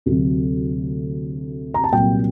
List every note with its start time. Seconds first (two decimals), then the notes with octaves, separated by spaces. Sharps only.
0.06 D2 C3 F#3
1.74 A#5
1.84 A5
1.93 C2 A#2 F#3 G5